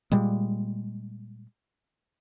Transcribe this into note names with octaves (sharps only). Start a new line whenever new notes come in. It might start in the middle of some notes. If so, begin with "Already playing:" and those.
A#2 G3 G#3